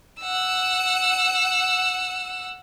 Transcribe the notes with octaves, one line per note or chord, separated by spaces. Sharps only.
F#5 E6